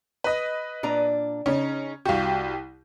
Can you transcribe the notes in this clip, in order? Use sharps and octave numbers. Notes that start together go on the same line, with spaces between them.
B4 D#5
A#2 D4 A#5
C#3 C#4 D#4
C2 F#4 G4 F5